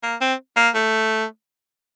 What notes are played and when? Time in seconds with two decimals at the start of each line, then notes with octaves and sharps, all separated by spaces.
0.03 A#3
0.21 C4
0.56 A#3
0.75 A3